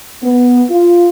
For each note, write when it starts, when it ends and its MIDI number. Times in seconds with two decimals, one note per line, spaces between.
0.22 0.62 59
0.70 1.09 65